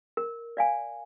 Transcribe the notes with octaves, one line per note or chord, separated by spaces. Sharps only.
A#4
D5 F5 G#5